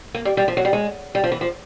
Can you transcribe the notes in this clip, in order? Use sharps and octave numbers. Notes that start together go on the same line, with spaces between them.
A#3
G3
G3
F3
F#3
G3
G#3
G3
F3
E3
F3